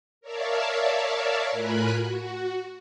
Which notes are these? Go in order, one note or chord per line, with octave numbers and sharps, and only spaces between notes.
A#4 C#5 D5 E5 F5 A5
A2 F4 A#4 G#5 B5 F#6
F#4